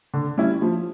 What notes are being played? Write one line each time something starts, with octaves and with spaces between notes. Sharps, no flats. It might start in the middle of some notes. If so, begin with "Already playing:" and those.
D3
G3 C#4 E4
F3